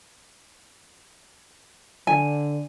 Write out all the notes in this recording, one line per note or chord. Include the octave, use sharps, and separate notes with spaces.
D3 G#5